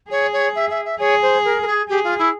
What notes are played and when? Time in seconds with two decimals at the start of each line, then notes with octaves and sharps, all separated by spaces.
0.10 G#4 C#5
0.33 C#5
0.55 E5
0.70 E5
0.85 E5
0.99 G#4 C#5
1.22 C5
1.45 A#4
1.62 A#4
1.67 G#4
1.89 G4 G#4
2.04 F4
2.18 E4